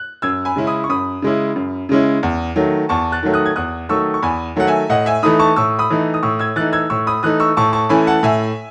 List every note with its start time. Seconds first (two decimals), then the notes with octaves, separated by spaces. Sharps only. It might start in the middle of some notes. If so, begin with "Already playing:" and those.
Already playing: F#6
0.22 F#2 E6 G#6
0.45 G#5 B5
0.56 C#3 G#3 C#4 E4
0.67 B5 D#6
0.84 C#6
0.89 F#2 B5 D#6
1.22 C#3 G#3 C#4 E4
1.56 F#2
1.89 C#3 G#3 C#4 E4
2.23 E2
2.56 D#3 F#3 A3
2.89 E2 A5 C#6
3.12 F#6 A6
3.23 D#3 F#3 A3
3.34 D#6 F#6
3.46 G#6
3.56 E2 D#6 F#6
3.89 D#3 F#3 A3 C#6 E6
4.14 C#6
4.23 E2 G#5 B5
4.56 D#3 F#3 A3 F#5
4.67 E5 G#5
4.90 A2 D#5 F#5
5.06 E5 G#5
5.23 E3 A3 D#4 B5 D#6
5.39 A5 C#6
5.56 A2 C#6 E6
5.79 B5 D#6
5.90 E3 A3 D#4
6.14 D#6
6.23 A2 C#6 E6
6.39 E6 G#6
6.56 E3 A3 D#4 F#6 A6
6.73 E6 G#6
6.90 A2 C#6 E6
7.07 B5 D#6
7.23 E3 A3 D#4 D#6 F#6
7.40 C#6 E6
7.57 A2 A5 C#6
7.73 A5 C#6
7.89 E3 A3 C#4 E4 G#5 B5
8.07 F#5 A5
8.23 A2 E5 G#5